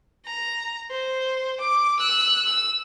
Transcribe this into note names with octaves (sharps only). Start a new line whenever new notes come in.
A#5
C5
D6
E6 F#6
E6